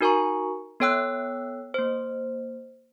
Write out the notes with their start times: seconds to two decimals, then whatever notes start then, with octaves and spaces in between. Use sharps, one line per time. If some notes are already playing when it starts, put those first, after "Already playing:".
0.01 D#4 F#4 A#4 G#5 A#5 C#6
0.80 B3 A4 C#5 G5 E6 F#6
1.74 A#3 C5